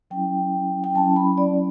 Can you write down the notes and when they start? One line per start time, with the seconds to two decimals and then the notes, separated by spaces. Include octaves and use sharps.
0.11 F#3 C#4 E4 G5
0.84 G5
0.95 F#3 C#4 E4 A5
1.16 B5
1.38 D5